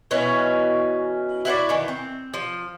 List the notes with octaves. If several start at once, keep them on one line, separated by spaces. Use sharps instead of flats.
B2 E3 C#4 F#4
E4 F#4 C5 D5
D#3 E3
C4
F3